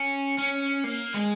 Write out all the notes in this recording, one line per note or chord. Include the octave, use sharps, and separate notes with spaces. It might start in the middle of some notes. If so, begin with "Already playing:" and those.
Already playing: C#4
C#4
A#3
G#3